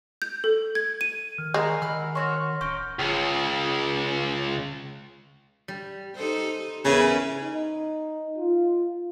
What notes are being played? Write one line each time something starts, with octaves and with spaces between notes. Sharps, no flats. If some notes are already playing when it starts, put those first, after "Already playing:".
G6
A4
G#6
D#7
D#3 F6
G#3 F#4 A#4 A#5 C7
D#3 E4 F#5 F6
C#4 F#4 C#5 C6 C#6 F6
D1 C#4 D#4 C#6 G6 D7
C#2 C#3
G3
D#4 A4 C5
E2 C#3 C#4 E4 A#4 B4 G#5
D#4
F4